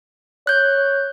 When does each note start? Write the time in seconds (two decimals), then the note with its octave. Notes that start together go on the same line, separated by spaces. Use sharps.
0.47 C#5 F#6 G6